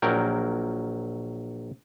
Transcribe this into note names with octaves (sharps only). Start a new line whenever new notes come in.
A#1 F#3 A#4 G5